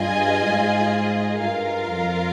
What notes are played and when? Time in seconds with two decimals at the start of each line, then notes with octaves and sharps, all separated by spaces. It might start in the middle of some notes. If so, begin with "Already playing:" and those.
Already playing: G2 F4 G#4 D#5 G#5
0.42 G#2
1.39 G2 F4 A#4 F5
1.88 F2